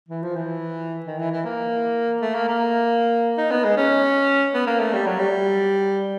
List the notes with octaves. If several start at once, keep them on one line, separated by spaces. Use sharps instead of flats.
E3
F3
E3
D#3
E3
E3
A#3
A3
A#3
A#3
D#4
B3
G#3
C#4
B3
A#3
A3
G3
F#3
G3